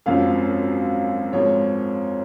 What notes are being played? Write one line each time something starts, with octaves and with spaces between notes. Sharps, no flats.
G#1 F#2 F3 F5
G#1 G#2 F3 C#5